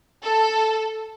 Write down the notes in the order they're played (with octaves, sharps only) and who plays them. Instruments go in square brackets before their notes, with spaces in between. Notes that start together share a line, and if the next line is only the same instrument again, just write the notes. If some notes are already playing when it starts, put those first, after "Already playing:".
[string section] A4